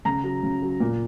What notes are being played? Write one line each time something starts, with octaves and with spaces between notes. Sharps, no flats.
C#3 A#5
F#3
C#3
F#3
A#2